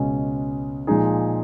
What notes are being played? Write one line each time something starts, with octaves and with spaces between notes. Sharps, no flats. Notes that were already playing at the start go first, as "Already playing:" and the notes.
Already playing: C#2 B2 G#3 C#4
A#2 F3 G#3 D#4 G#4